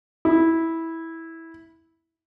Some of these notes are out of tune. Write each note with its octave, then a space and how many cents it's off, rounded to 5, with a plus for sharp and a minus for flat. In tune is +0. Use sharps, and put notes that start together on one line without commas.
E4 -10